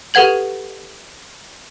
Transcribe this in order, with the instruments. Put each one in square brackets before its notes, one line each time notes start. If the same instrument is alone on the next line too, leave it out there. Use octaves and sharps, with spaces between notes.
[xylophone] G4 A4 B4 F#5 G#6 F#7